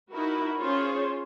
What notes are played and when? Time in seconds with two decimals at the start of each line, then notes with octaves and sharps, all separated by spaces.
0.11 D#4 E4 F#4 A#4 B4
0.58 C#4 F4 G#4 C5 C#5